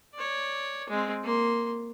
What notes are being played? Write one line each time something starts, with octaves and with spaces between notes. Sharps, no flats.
C#5 D5
G#3 C4
A#3 C6